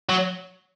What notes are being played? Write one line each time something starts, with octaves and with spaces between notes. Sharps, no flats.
F#3